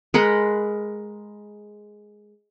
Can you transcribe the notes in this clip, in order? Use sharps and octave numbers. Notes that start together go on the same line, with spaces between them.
G#3 A#4 F#5 B5